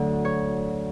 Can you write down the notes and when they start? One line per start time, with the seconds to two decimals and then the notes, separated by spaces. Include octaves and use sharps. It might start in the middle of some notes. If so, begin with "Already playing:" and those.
Already playing: D2 D3 F#3
0.25 C#5